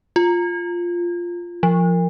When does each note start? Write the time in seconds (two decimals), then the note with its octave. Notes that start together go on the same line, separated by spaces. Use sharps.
0.16 F4
1.63 F3